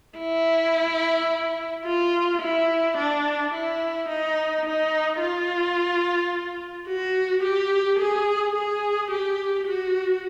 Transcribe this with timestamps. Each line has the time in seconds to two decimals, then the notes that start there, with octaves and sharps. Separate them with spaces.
0.18 E4
1.85 F4
2.41 E4
2.97 D4
3.53 E4
4.08 D#4
4.65 D#4
5.20 F4
6.88 F#4
7.43 G4
7.99 G#4
8.55 G#4
9.10 G4
9.67 F#4